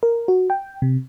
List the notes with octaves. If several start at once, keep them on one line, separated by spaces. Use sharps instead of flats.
A#4
F#4
G5
C3